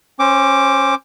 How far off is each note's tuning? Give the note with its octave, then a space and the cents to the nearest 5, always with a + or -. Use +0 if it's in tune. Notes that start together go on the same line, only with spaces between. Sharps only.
C#4 -25 C5 +0 D6 +0